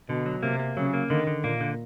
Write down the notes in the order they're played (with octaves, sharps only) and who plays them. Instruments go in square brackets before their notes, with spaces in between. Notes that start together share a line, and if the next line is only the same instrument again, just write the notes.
[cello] B2 [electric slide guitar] D3
[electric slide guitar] F#3
[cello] C3 [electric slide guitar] A#3
[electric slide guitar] A#3
[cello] C#3 [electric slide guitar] F#3
[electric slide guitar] A#3
[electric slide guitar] D3 [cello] D#3
[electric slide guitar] D3
[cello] A#2 [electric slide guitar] A#3
[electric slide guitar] D3